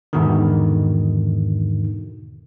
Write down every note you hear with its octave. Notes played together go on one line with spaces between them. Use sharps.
E2 G#2 B2 D3 D#3